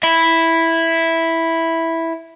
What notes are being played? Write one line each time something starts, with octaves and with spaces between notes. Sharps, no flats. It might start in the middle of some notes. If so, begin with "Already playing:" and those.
E4 E5